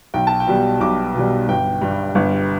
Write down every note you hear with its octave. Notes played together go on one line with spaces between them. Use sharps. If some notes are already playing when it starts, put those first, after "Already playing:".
B1 G5
A5
G5
B2 G3
B1 D6
B2 G3
G1 G5
G2 G3
G1